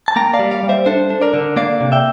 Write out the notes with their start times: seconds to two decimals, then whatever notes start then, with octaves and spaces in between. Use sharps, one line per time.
0.08 A5
0.16 A#3 G5 A#5
0.33 D5 F5
0.39 G3
0.51 D5 F5
0.63 G3
0.69 C5 E5
0.86 D4 A4 C5
1.10 D4
1.21 A#4 D5
1.34 D3
1.56 A#3 D5 F5
1.81 C3
1.92 E5 G5